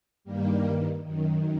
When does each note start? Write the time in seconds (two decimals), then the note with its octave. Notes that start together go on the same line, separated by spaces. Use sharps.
0.24 G2 D#3 G3 A#3
1.02 F#2 D#3